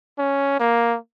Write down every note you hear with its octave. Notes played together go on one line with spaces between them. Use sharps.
C#4
A#3